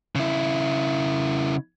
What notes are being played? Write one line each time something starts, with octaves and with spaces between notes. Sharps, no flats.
C#3 E4